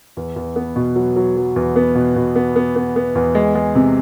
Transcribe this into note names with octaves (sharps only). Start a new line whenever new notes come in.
E2
E2
B3
B2
F#3
F#3
F#3
E2
B3
B2
B2
B3
B3
B3
B3
E2
G#3
G#3
C3